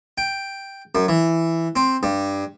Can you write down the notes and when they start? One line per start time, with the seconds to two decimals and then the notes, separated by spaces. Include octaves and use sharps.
0.18 G5
0.95 F#2
1.08 E3
1.76 C4
2.03 G2